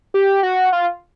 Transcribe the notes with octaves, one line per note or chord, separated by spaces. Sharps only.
G4
F#4
F4